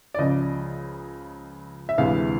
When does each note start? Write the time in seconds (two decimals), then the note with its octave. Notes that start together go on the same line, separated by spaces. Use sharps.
0.14 D5
0.18 C#2 C#3 F3 D#5
1.89 E5
1.98 D2 C3 E3 G#3 F5